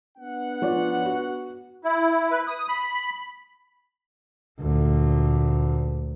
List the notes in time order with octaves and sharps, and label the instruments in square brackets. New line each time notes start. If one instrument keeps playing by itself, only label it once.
[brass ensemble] B3 D4 F#5
[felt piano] F3 C#5 D5
F#4
[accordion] E4
B4
D#6
B5
[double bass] D2 A#2